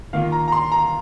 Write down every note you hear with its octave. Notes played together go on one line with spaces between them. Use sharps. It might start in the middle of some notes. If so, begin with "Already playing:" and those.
D#3 A#3 F4 F5
A#5
A#5
C6
A#5